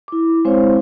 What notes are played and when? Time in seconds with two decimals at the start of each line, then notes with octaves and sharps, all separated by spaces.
0.08 E4 D6
0.45 G#3 C4 E4 C5 C#5 F5